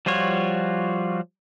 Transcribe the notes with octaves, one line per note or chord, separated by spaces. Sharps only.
F3 G3 F4 F#4 C#5